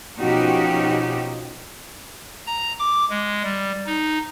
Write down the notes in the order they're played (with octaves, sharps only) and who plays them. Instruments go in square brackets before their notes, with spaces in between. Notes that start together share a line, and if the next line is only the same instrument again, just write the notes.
[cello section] B2 F3 C#4 D#4 F#4 G4
[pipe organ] A#5
D6
G#3
G3
D#4